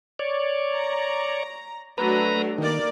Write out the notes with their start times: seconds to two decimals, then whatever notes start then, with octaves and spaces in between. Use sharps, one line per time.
0.19 C#5 D5
0.75 A#5
1.98 F#3 A3 D4 B4 A#5
2.58 D#3 A#3 A#4 D5